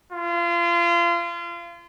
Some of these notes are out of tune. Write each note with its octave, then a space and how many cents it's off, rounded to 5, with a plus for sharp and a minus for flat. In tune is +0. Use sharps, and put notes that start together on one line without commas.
F4 -30